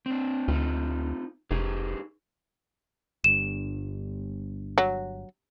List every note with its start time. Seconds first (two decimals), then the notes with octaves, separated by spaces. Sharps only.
0.06 C4 D4
0.48 D2 C4 D#4 F4
1.51 F1 D#4 G4 G#4
3.24 G1 G2 E7
4.78 F#3